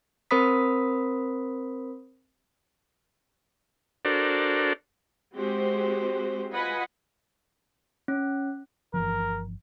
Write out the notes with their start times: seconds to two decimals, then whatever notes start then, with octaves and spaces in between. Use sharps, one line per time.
0.31 C4 A#4 C5 B5 D#6 B6
4.05 D4 F#4 A4 A#4 C5 D5
5.36 G#3 C4 F#4 G4 C5
6.52 F4 B4 D#5 F#5 G#5 B5
8.08 C#4
8.94 G1 E3 F3 A#4